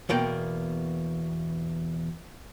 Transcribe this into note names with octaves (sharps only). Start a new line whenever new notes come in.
E2 B2 A#3 G5